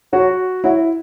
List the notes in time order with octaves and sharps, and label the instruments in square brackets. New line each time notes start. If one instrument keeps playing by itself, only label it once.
[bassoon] F#3 [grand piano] F#4
[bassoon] F#3 [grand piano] E4